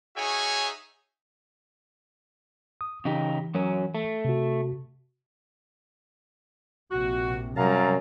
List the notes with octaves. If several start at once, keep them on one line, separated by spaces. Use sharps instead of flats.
D#4 F#4 G#4 C#5 E5 G#5
D#6
C#3 E3 D#4 G4
F#2 F#3 C#4
A3
C3 F#4
A#1 C3 F#4
F#2 C3 F#3 G3 F5 A5 A#5